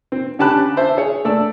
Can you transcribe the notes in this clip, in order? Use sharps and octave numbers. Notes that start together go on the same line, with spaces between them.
C4
D3 C#4 G4 A5 B5 F#6
C5 E5 A5
G#4 C#5
A3 D5 E6